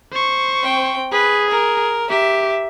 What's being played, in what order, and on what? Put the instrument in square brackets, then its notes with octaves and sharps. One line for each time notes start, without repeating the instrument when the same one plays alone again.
[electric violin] C5 C#6
[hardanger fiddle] C4 G5
[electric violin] G#4 [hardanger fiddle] B4
[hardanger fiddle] A#4
[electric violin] G4 [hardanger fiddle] E5